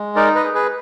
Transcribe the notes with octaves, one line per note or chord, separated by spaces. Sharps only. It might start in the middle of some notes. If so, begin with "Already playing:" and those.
Already playing: G#3
D#4 A#4 D5
B4 D#5
G#4
G#4 B4